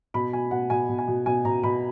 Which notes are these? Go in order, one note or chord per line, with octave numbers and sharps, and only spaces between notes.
B2 B5
B2 G#5
B2 F#5
B2 G#5
B2
G#5
B2
B2 G#5
B2 A#5
B2 B5